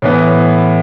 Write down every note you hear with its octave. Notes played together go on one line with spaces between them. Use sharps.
A2 E3 B3